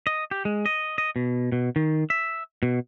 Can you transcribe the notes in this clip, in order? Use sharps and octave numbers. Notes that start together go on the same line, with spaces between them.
D#5
G4
G#3
D#5
D#5
B2
B2
D#3
E5
B2